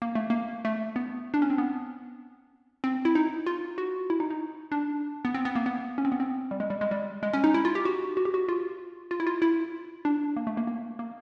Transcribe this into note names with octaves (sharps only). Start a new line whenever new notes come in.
A#3
A3
A#3
A3
B3
D4
C#4
C4
B3
C4
E4
D#4
F4
F#4
E4
D#4
D#4
D4
B3
C4
B3
A#3
B3
C#4
C4
B3
C4
G3
G#3
G3
G#3
G3
G#3
C#4
D#4
E4
F4
G4
F#4
F#4
G4
F#4
F4
F4
E4
F4
E4
D4
A#3
A3
A#3
A#3
A#3